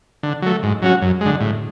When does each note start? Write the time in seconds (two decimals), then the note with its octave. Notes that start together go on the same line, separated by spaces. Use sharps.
0.23 D3
0.42 F#3 A3
0.63 G#2
0.82 F#3 C#4 F#4
1.02 F#2
1.21 D3 G#3
1.41 A2